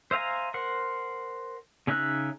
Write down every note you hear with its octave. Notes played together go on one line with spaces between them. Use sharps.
C5 E5 F5 G#5 A#5
A#4 C5 F#5
C#3 C#4 D#4 E5 F#6